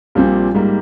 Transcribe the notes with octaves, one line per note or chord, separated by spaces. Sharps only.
A#1 A#2 G3 C4
G#2 G3 A#3